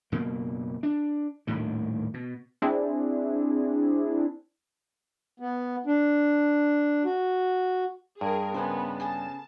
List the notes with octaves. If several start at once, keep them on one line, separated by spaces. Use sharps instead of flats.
F#1 B2 A#3
D4
D#1 D2 A2 D#3
B2
C4 D4 E4 G#4
B3
D4
F#4
G2 G#4 A#4
C#3 B3 B4 C5 D#5 G#5
G#4 A4 A5 D#6